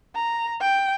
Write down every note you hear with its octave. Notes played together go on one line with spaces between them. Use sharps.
A#5
G5